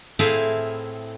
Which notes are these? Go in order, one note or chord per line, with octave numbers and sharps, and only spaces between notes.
A2 C4 E4 G#4 F5 A5